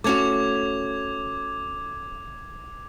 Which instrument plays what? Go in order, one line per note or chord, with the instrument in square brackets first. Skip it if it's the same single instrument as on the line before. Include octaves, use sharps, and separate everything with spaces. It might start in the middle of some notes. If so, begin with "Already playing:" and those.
[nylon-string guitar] A3 C#4 F#4 [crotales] D6 G#6 F7